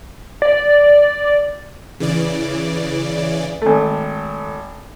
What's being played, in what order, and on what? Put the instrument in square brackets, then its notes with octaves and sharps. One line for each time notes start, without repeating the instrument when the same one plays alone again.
[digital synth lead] D5
[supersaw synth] C#3 E3 D5
[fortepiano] G#1 A3